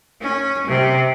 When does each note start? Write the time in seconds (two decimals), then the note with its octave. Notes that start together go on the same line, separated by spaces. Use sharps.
0.21 C#4
0.67 C3